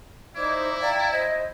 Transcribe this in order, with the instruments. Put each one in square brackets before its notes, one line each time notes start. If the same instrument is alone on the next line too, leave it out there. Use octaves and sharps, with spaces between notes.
[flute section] D#4 C5 D5 [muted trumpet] E4 [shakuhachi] D6
[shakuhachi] D5 [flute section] F5 G5 A#5
[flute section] C5 [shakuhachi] D#5